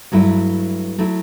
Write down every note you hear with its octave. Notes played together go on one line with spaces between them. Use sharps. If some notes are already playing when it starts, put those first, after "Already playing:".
G2 F#3 A3 E4
F#3 A3 E4